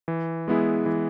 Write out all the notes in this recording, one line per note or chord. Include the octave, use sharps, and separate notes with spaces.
E3
G#3 B3 E4 G#4
E3